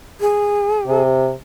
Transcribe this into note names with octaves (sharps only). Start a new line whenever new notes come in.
G#4
C3